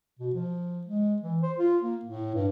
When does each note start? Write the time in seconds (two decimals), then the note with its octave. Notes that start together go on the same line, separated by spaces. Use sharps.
0.19 B2
0.34 F3
0.87 G#3
1.22 E3
1.42 C5
1.58 F4
1.82 A#3
2.05 A2
2.35 G2